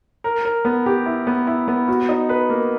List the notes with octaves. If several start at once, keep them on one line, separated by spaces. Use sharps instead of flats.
A#4
A#4
B3
G4
E4
B3
E4
B3
F#4
D#4
B4
A#3